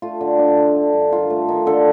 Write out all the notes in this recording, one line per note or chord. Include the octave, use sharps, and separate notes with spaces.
A3 F4
D3
D4
A3
D3
G2
D#3 F4
A3
D#3
D3 A4